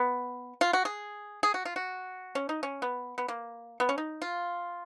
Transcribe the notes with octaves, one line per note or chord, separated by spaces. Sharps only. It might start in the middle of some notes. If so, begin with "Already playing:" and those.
Already playing: B3
F4
F#4
G#4
G#4
F#4
F4
F#4
C#4
D#4
C#4
B3
B3
A#3
B3
C#4
D#4
F4